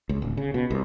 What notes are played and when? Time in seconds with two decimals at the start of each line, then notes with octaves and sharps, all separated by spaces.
0.09 C#2
0.22 D1
0.37 C#3
0.54 B2
0.70 C2